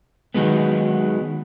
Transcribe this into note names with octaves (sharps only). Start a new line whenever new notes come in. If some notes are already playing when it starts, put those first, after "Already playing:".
D#3 F#3 G#3 B3